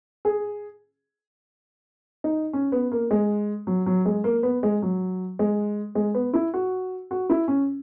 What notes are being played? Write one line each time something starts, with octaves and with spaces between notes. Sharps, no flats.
G#4
D#4
C#4
B3
A#3
G#3
F#3
F#3
G#3
A#3
B3
G#3
F#3
G#3
G#3
B3
E4
F#4
F#4
E4
C#4